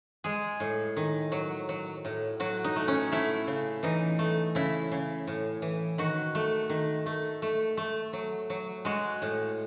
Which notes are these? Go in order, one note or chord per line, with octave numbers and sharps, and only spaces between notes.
G#3 G#4
A2
D#3
F#3
F#3
A2
F#3 F#4
D#4
A3
C#4
A3 E4
C#3
E3 D#4
A3
C#3 E4
C#3
A2
E3
D#3 F#4
A3
D#3
A3
A3
A3
F#3
F#3
G#3 F#4
A2